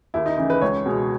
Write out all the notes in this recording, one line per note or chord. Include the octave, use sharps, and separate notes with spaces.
D#2 E4
D#4
C#3 E3 D#4
B4
C#2 C#5
B2 G#3